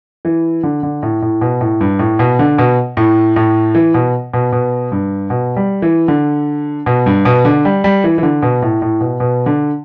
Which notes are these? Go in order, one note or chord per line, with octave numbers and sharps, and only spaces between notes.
E3
D3
D3
A2
A2
B2
A2
G2
A2
B2
D3
B2
A2
A2
E3
B2
B2
B2
G2
B2
G3
E3
D3
B2
G2
B2
D3
G3
G3
E3
E3
D3
B2
A2
A2
B2
B2
D3